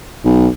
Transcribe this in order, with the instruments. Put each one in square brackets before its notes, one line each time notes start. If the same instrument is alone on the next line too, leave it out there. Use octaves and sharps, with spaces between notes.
[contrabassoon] B1